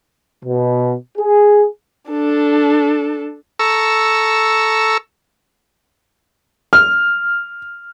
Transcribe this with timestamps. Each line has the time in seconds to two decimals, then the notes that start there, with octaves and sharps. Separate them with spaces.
0.45 B2
1.18 G#4
2.09 D4 A4
3.59 A4 A#5 C#6 E6
6.73 F6